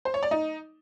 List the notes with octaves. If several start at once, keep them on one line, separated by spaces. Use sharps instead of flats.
C5
C#5
D5
D#4